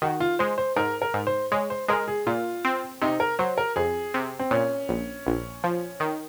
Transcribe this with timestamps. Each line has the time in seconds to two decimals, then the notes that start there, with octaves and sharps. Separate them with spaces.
0.02 D#3 F#4
0.20 F4
0.39 G#3 C5
0.58 C5
0.76 G#2 A#4
1.02 A#4
1.14 G#2
1.27 C5
1.52 G#3 C#5
1.70 C5
1.88 G#3 A#4
2.08 G#4
2.26 A#2 F4
2.65 C4
3.01 C3 D#4
3.20 A#4
3.39 F#3 C5
3.58 A#4
3.76 F2 G#4
4.14 C3
4.39 C4
4.51 A#2 C#4
4.89 A#1
5.27 A#1
5.64 F3
6.00 D#3